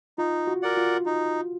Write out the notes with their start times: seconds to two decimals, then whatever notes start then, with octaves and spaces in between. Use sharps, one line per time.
0.18 D#4 F4
0.47 F#4
0.63 A#4 D5 F#5
0.77 F4
1.06 D#4